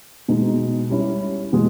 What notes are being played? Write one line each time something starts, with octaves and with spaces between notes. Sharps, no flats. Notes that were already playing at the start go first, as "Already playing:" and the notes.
B2 G#3 D#4
G3 C#4 E4
B2 G#3